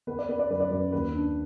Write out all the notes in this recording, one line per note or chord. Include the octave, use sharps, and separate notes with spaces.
B3 B4
D5
B3 B4
D5
F#2 B4
D5
F#2 B4
D#2 B4
D4